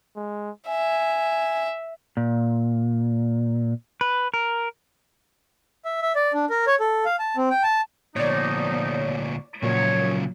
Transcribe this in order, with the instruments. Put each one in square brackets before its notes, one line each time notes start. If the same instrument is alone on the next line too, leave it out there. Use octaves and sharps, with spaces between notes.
[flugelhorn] G#3
[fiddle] E5 [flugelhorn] G#5
[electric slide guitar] A#2
B4
A#4
[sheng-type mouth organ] E5
E5
D5
D4
A#4
C#5
A4
F5
A5
C4
G5
A5
[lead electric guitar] D2 A#2 [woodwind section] F3 B3 D#4 [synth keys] C#5 D5
[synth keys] A#2 F#3 [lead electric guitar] C#3 F3 [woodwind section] C#5